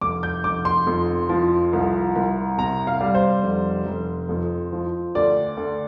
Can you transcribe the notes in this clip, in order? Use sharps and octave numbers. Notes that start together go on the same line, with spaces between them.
F1 D6
G6
F1 D6
C6
F2
F3
C2
C2
C3 A#5
F5
G3
C5
F1
F1
F2
F3
D2 D5
D2